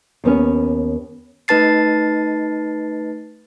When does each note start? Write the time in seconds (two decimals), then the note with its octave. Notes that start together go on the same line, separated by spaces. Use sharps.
0.24 D#2 B3 C#4
1.48 A3 D#4 B4 A5 A6 C7